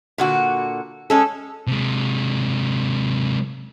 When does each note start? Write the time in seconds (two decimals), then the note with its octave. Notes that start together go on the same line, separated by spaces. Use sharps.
0.18 A#2 D3 F#4
1.10 G#3 C#4 A4
1.67 C3 G#3